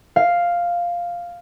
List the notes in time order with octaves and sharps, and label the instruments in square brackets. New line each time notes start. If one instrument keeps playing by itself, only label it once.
[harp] F5